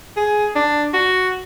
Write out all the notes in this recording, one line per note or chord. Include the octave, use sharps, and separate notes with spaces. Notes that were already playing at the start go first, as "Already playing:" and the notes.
G#4
D4
F#4